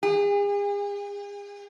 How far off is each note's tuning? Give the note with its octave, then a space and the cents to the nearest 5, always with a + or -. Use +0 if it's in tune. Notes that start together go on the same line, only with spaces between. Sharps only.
G#4 -40